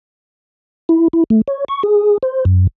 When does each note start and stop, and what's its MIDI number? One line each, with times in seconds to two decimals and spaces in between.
0.89 1.08 64
1.13 1.24 64
1.30 1.41 57
1.48 1.65 73
1.68 1.83 85
1.83 2.18 68
2.23 2.45 72
2.45 2.67 42